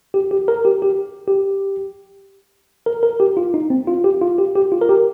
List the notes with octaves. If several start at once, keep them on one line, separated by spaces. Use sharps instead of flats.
G4
G4
A#4
G4
G4
G4
A#4
A#4
G4
F4
D#4
C4
F4
G4
F4
G4
G4
F4
A#4
G4